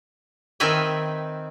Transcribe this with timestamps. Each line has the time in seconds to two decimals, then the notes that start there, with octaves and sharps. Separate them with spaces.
0.60 D#3 C4 B4 E5 G#5